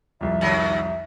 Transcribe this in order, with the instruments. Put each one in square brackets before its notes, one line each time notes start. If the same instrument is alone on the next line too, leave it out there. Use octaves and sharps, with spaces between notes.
[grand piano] C2 F2 [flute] E5
[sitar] D#2 F#3